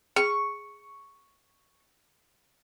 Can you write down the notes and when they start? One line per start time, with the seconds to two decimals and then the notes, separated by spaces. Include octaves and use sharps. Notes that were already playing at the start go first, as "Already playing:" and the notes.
0.16 G#4 C#6